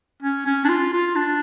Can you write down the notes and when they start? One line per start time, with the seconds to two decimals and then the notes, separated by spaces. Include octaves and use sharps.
0.23 C#4
0.46 C#4
0.65 D4
0.69 F4
0.93 F4
1.16 D4